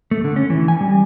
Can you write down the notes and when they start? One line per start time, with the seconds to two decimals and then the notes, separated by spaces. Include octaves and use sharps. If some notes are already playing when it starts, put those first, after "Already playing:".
0.11 A3
0.24 D3
0.36 C#4
0.50 E3
0.68 G#5
0.81 G3